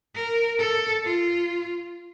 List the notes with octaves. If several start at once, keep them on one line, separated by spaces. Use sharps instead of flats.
A#4
A4
F4